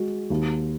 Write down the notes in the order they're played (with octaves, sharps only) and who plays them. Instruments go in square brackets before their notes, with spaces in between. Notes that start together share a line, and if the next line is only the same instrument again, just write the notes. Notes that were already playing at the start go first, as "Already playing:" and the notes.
Already playing: [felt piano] G#3 F#4
D#2